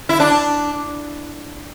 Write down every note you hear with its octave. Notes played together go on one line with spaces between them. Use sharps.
E4
D4